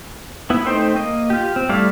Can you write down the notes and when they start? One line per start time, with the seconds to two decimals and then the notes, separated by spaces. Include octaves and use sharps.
0.50 B3 E4
0.66 A3 C4 D#4 C5 G5
0.96 A#3 D#5
1.30 F4 G4
1.56 C4
1.69 G3 A3 E4 D5 F5